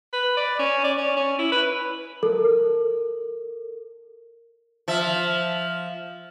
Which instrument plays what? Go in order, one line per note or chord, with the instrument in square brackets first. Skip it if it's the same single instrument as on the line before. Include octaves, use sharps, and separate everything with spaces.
[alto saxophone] B4
D5
C#4
D5
C#4
C#4
E4
B4
[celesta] A4 A#4
[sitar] F3 E5